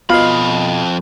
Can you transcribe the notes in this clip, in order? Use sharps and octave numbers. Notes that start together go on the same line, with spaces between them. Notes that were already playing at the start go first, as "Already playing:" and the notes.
F2 B2 F4 D#5 F5 B5